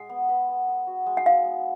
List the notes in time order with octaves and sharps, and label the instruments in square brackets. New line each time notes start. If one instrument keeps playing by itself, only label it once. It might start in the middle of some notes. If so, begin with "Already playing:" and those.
Already playing: [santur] G#3 G#4 [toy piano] F#5
[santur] B3
B4
B3
B4
F#4
G#3
[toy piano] F#5
[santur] D#4 [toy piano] F5
[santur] B3